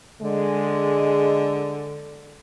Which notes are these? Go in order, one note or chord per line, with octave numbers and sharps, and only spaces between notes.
D3 G#3